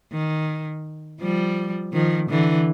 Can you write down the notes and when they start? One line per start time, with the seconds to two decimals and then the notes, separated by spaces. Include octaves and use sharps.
0.12 D#3
1.20 F3 G3
1.93 D#3 F3
2.29 D3 E3